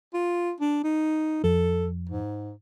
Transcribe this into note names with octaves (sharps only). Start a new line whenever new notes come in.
F4
D4
D#4
F2 A4
G#2